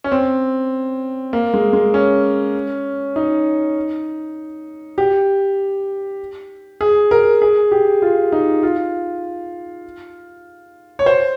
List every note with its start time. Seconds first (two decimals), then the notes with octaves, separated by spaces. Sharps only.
0.04 C#4
0.12 C4
1.33 A#3
1.54 G#3
1.73 G#3
1.94 C#4
3.16 D#4
4.98 G4
6.81 G#4
7.11 A#4
7.42 G#4
7.72 G4
8.02 F4
8.32 D#4
8.63 F4
10.99 C#5
11.06 C5